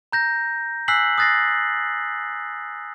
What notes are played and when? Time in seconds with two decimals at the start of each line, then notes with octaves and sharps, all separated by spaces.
0.12 A#5 G6 A#6
0.88 G#5 E6 F#6 B6 C7 F#7
1.18 D#6 F#6 A6 A#6 C7